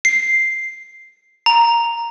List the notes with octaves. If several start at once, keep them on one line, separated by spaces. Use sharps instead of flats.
C7
A#5